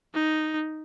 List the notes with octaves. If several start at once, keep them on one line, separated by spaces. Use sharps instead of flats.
D#4